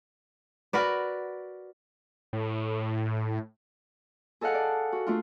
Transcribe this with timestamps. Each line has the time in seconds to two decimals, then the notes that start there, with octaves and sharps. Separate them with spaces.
0.73 F#4 A#4 B4 D5
2.33 A2
4.41 G#4 A4 D#5 F5 F#5
4.54 D5
4.93 F#4
5.07 A3 D4 F4